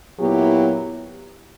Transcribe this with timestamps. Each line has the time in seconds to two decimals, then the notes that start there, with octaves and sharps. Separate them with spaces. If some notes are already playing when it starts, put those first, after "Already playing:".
0.18 A#2 F#3 B3 E4 G4